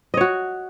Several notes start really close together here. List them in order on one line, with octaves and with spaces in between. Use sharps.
D#5 C#5 F#4